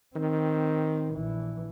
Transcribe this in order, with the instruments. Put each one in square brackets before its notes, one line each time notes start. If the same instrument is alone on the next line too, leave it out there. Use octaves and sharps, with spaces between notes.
[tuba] D#3 [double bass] C4
[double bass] A#1 E3